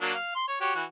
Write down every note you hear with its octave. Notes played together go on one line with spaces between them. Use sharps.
F#3 A#3 D4
F5
C6
C#5
F#4 G4 C#5
E3 F#4